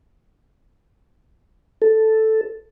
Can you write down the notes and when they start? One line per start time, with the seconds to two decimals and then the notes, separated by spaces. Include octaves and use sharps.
1.82 A4